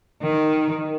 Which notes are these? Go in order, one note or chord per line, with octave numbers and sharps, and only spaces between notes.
D#3